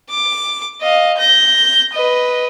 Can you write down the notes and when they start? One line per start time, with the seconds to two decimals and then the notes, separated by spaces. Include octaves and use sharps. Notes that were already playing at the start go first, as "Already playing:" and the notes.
0.10 D6
0.81 D#5 F5
1.18 G6 A#6
1.93 B4 D#5